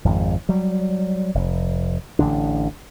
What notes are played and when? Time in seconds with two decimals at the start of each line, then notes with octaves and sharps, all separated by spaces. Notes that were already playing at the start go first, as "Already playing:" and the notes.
0.05 G#1 F2 G#2
0.49 F#3 G3
1.35 F1
2.19 A1 D3 D4